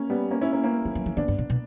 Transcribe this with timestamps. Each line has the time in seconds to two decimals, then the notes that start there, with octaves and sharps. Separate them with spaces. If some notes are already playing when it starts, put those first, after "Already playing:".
Already playing: A#3 C#4
0.10 G3 B3
0.31 A#3 C#4
0.41 C#4 E4
0.53 A#3 C#4
0.64 A#3 C#4
0.85 G3
0.95 F#3
1.06 E3
1.16 D3 B3 D4
1.28 G2
1.38 A#2
1.50 B2